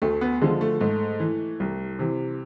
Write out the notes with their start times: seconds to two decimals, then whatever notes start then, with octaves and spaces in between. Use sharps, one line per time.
0.02 D2 A3
0.21 B3
0.41 D3 F3 G#3
0.61 A3
0.80 G#2 A3
1.20 E3
1.60 C2
1.99 C3 E3